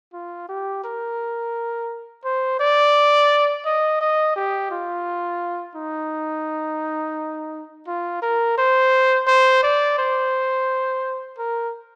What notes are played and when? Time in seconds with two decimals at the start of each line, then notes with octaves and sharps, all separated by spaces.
0.13 F4
0.49 G4
0.84 A#4
2.24 C5
2.60 D5
3.66 D#5
4.01 D#5
4.36 G4
4.71 F4
5.75 D#4
7.87 F4
8.22 A#4
8.58 C5
9.27 C5
9.63 D5
9.98 C5
11.38 A#4